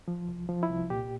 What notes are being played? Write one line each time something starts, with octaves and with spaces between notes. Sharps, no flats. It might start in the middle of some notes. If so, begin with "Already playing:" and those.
F3
C2
F3
E4
C2
A#2 G4